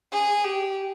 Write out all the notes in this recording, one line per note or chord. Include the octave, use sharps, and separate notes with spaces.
G#4
G4